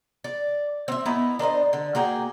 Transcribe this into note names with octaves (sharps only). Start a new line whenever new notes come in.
D5
C4 E5
B3 D#4 E4
D4 A#4 C5 D#5
D3
A#3 F#4 G#4 G5